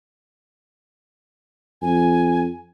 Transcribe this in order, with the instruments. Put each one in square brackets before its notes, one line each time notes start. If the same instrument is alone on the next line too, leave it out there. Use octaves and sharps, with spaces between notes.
[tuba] F2 [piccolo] G#5